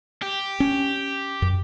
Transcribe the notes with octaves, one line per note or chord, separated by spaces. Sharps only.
G4
C#4
F#2